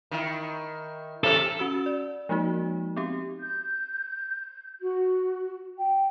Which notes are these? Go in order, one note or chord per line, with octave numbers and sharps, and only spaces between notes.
D#3 E4
C3 E3 C#4 A4
C#4 F#4 E6
D5
F3 G#3 A#3 D#4 F#4
B3 C4 G4
G6
F#4
G5